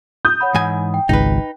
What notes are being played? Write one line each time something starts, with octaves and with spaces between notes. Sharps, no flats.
D#6 G6
C#5 F#5 B5
G#2 E3 G#5
G5
G#1 C#2 D#4 B4